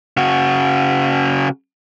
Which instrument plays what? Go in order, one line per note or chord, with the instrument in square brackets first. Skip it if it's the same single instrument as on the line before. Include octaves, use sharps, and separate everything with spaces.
[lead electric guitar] C#3 F#4